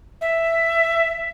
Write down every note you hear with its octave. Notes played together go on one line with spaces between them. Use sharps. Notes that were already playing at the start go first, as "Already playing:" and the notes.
E5